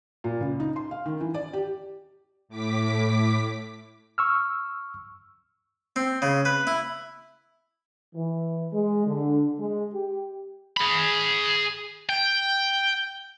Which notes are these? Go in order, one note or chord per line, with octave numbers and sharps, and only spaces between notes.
A#2
C#2
D#4
C6
F5
D#3
E3
D5
G4
A2 D6 B6
C#6 E6 F6
C4
C#3
B4
E4
E3
G#3
D3
G#3
G4
G#4 B5
G5